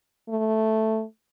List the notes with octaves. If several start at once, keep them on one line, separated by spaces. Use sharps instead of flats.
A3